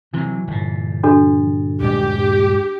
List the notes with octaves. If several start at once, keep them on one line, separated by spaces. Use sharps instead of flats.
C3 E3 F#3
G1 A#2
D4 F#4 A4
D#1 G2 G#3 G4